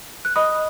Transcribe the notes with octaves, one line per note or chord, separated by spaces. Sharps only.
F#6
D#5 B5 D#6